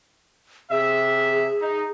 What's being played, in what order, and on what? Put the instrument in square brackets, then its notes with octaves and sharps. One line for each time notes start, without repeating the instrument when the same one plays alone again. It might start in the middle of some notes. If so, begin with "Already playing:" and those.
[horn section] C3 E5 [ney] G#4
[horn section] D#4